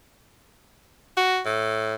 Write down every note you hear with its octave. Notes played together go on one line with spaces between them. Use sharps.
F#4
A2